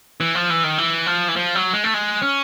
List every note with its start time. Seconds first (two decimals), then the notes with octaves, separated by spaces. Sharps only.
0.20 E3
0.35 F3
0.50 E3
0.64 D#3
0.78 E3
1.06 F3
1.28 E3
1.36 F3
1.55 F#3
1.73 G#3
1.84 A3
1.94 G#3
2.22 C#4